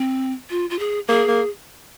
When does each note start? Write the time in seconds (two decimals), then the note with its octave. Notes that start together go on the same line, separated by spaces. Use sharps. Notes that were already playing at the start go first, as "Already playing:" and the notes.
Already playing: C4
0.50 F4
0.70 F4
0.79 G#4
1.08 A#3 G#4
1.28 A#3